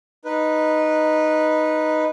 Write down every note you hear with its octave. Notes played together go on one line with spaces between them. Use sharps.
D#4 B4